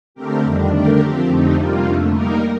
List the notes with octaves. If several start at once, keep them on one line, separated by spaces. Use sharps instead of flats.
D3 A3 C4 G4 A#4
F2 D#3 G3 D4
D3 A3 D4 G4 A#4
F3 C4 G4
F2 D3 A3 C4 D#4
C3 G3 A#3 F4
F2 D3 A3
G3 A#3 D#4 A#4